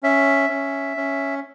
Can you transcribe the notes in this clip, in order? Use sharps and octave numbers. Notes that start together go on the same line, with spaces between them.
C#4 E5
C#4
C#4